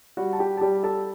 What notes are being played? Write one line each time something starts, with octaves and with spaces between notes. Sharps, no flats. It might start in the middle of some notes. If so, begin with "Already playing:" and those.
G3 F#4 F#5
A5
G4 G5
A5
G3 G4 G5
A4 A5